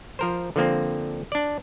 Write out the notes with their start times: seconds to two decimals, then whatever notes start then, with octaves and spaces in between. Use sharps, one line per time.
0.19 F3 A#4 C5
0.56 D3 F3 A#3 C4
1.32 D4 D5